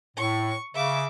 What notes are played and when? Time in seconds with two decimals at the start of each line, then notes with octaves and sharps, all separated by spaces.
0.17 A2 C#6
0.75 C#3 E5 D6